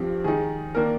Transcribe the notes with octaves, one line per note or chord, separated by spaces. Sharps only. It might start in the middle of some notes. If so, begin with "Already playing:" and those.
Already playing: G2 F3 C4 G4
D#3 G#3 D#4 G#4
D#3 A#3 D4 A#4